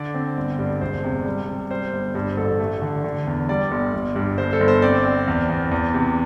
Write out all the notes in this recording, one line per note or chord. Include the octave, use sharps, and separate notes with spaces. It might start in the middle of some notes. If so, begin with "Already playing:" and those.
Already playing: D3 D5
C4
G1
G2
E1 C5
C3
G3
C3
G3 C5
G1
G2 C5
A1 A4
A3
D3
D3
E2
G3 D5
G1
G1
G2
G1 C5
A4
G1
C5
C4 D5
C4
E2
E2
E2
C3